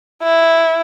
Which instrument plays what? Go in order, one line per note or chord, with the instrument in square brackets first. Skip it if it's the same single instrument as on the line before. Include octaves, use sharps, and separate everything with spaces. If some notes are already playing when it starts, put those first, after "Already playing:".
[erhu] E4